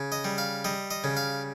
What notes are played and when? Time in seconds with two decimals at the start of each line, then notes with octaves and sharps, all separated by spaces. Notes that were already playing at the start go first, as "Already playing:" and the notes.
Already playing: C#3
0.12 D#5
0.24 G3
0.38 F5
0.65 G3 D#5
0.91 D#5
1.04 C#3
1.17 F5